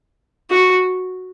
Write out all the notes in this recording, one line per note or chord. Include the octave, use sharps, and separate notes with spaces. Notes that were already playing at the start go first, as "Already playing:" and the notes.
F#4